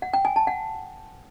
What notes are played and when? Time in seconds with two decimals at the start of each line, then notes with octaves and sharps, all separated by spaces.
0.02 F#5
0.13 G5
0.25 G#5
0.36 A5
0.47 F#5